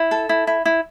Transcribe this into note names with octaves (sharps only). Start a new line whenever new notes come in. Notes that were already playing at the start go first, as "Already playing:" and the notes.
Already playing: E4
A4
E4
E4
E4